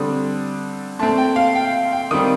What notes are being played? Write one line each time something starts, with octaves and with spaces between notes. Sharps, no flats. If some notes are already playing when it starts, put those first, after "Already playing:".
Already playing: D3 G3 C4 D#6
A#2 A3 C4 A5
G5
F5
G5
G5
D#3 G3 C4 D#6